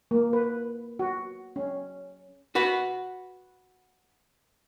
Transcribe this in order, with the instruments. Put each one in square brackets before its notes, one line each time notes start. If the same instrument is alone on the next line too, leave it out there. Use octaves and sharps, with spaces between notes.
[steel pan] A#3
B4
F#4
C#4
[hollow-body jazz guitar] F#4 B4